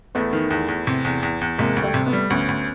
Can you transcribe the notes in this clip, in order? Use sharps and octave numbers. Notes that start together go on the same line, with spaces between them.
E2 A3 B3
D#3
E2
E2
C3
E2
E2
E2
C3 G#3 A#3
D2
G3 A3
C3
A3 B3
G3
D2 B3 C#4
D2